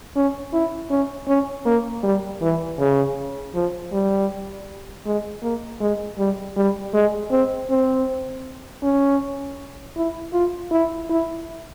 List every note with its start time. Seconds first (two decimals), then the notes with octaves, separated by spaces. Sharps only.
0.16 C#4
0.53 E4
0.90 C#4
1.28 C#4
1.65 A#3
2.03 G3
2.42 E3
2.79 C#3
3.55 F3
3.92 G3
5.06 G#3
5.43 A#3
5.80 G#3
6.18 G3
6.57 G3
6.94 G#3
7.31 C4
7.70 C4
8.83 C#4
9.96 E4
10.33 F4
10.71 E4
11.10 E4